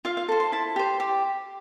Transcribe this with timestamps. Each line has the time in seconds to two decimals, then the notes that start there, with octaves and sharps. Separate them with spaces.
0.05 F4 F5
0.17 F5
0.28 A4 C5
0.40 C6
0.52 E4 A5
0.76 G4 C5
1.00 G4